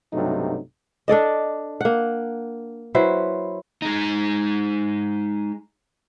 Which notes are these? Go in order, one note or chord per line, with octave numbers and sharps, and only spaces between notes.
B1 G2 C3 F#3 A3 D#4
D4 A4 D5 D#5
A#3 F#5
F#3 E4 B4 C5
G#3 D#4